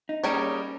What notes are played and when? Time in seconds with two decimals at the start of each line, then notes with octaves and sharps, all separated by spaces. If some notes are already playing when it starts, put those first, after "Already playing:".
0.09 D#4
0.23 G3 A#3 C#4 D#4 G#4 C#5